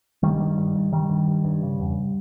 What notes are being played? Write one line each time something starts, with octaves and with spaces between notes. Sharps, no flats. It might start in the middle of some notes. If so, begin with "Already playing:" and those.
G2 D#3 G3
G2
G2
G2
G2 D#3 G3
G2
G2
G2
C#3
E2